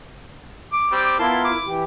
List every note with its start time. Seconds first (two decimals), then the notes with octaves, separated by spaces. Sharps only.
0.72 D6
0.92 G3 C4
1.19 B3 E4 F4 A#4 A5 C6
1.44 D6
1.67 E3 G4